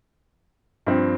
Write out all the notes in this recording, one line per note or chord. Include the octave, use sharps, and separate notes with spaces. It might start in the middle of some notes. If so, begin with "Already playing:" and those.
G2 F3 C4